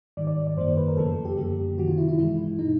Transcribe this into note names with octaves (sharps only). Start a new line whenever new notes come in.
G#2 D#3 G3 D5
D5
D5
F#2 D#3 G3 A#3 C5
B4
A#4
F2 C#3 F3 A3 A4
G4
F#2 D3 G3 A#3 G4
C3 D#3 F#3 F#4
F4
E4
E4
G2 E3 G#3 E4
B2 G#3 D#4